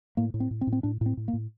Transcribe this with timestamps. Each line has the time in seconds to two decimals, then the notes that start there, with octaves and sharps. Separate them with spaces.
0.17 A2 A#3
0.34 A2
0.40 C4
0.51 A2
0.61 C4
0.67 A2
0.73 C4
0.83 A2 D4
1.01 A2 C4
1.17 A2
1.28 A#3
1.33 A2